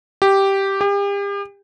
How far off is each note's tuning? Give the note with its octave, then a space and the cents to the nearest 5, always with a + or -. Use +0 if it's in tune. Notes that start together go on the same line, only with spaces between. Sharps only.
G4 -5
G4 +40